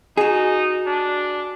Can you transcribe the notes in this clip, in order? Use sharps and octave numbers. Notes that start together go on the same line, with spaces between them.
D#4 F#4 G#4
D4